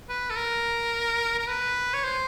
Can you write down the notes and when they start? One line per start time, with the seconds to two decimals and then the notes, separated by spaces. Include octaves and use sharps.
0.09 B4
0.30 A4
0.36 A#4
1.39 A#4
1.47 B4
1.94 C#5
2.04 C5